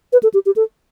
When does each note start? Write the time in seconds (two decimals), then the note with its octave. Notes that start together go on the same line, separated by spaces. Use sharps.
0.13 B4
0.23 A4
0.34 G4
0.46 G4
0.56 A4